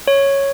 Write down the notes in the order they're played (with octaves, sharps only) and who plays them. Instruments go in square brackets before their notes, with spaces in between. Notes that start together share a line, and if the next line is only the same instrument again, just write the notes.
[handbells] C#5